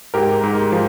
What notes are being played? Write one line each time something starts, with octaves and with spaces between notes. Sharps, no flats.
G#2 G4 A#4
G#2
F3